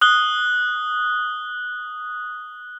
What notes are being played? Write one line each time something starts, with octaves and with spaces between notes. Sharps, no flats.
D#6 F#6 G7